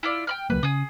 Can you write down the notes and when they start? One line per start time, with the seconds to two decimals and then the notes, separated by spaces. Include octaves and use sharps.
0.03 E4 F4 D5
0.27 G5 B5 F6
0.50 C#2 F#3 A#3 B4
0.63 C#3 G#4 D#6